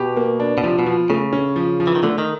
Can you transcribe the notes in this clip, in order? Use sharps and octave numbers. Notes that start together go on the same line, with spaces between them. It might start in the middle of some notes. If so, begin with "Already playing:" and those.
Already playing: B2 G4
A#3
D4
B2
C3 F3
B2
F3
C#3 A3
C#4
F3
F3
E3
D#3
D3 A3
D#3